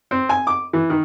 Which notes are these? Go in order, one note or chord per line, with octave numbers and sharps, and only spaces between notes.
C4
G#5
D6
E3
D#3